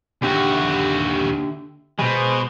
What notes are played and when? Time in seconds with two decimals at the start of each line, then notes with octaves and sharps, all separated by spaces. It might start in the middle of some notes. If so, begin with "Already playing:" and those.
0.22 D#2 D3 F#4 G4 E5
1.99 B2 G#3 C5